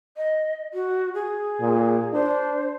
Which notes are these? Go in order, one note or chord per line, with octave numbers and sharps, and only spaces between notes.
D#5
F#4
G#4
A#2
D4 C5